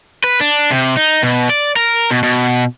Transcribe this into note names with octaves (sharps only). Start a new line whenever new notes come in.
B4
D4
C3
D#4
B2
D5
A#4
B2
B2